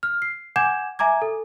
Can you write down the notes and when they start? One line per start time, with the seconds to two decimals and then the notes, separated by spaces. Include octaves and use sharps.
0.03 F6
0.22 C7
0.56 F#5 G#5 D6 G6 G#6 E7
0.99 E5 G#5 A#5 D6 G#6
1.22 A4